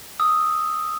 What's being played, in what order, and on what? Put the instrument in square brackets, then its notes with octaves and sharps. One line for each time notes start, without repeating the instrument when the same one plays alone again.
[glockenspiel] D#6 E6